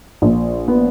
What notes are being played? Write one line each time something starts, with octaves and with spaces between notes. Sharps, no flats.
A#1
B3